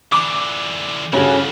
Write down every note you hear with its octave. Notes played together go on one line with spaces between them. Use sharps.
D3 E3 D6
G2 C#3 E3 F3 C#4 F#4 A4